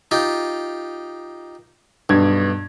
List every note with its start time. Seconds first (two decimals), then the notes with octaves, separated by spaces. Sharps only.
0.11 D#4 F4 G4
2.09 B1 G2 G#6